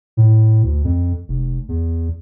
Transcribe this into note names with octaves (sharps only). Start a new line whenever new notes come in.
A2
D2
F2
F1
E2